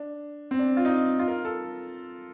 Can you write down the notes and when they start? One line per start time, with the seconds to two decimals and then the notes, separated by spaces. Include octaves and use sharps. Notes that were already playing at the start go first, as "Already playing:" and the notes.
Already playing: D4
0.51 C4
0.59 D4
0.77 F4
0.85 D#4
1.19 F4
1.28 A#4
1.45 A4